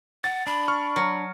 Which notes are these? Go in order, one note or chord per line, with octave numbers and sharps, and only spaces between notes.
F#5 A6
D4 B5
C#6 F6
F#3